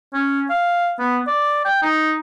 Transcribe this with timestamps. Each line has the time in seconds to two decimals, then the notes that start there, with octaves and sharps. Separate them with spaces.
0.14 C#4
0.50 F5
0.99 B3
1.27 D5
1.65 G5
1.83 D#4